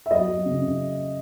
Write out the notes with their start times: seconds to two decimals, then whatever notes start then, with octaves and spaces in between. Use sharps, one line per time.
0.06 E5
0.11 F#3 D#5
0.28 F#3
0.46 C#3
0.62 C#3